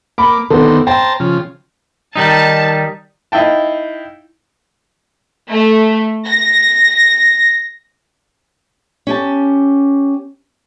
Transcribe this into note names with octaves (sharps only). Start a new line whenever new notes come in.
A#3 B5 D6
D3 D#3 B3 C4 A4
C5 G5 A5 A#5
C#3 F3
D#3 G3 D#4 A5
D#4 E4 F5 G5 A5
A3
A#6
C#4 G4 A5